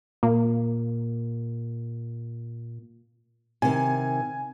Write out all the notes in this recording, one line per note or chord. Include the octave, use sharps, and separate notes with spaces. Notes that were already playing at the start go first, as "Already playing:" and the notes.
A#2 A#3
C3 D#3 G#5